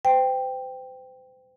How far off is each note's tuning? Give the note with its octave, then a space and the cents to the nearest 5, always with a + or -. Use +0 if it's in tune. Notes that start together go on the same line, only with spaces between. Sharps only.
C5 -40 G5 +5